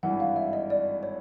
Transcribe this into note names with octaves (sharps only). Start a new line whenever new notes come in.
G#1 G2 E3 F#5
F5
E5
D#5
D5
C#5